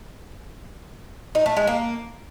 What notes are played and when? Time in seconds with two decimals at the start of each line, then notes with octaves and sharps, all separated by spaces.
1.35 D#4
1.46 A3
1.57 G#3
1.67 A#3